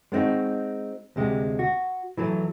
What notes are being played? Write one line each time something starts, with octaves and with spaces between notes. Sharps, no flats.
G#3 B3 C4 D#4 F#4
D2 C3 G#3
F#4
E3 F#3 A3